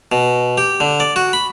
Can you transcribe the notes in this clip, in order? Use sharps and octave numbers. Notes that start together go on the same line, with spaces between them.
B2
G4
D3
D5
F#4
B5